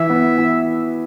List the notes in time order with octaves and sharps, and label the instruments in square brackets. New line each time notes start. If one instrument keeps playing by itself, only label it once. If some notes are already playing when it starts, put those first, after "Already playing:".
Already playing: [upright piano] E3 [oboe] E5
[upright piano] B3
E3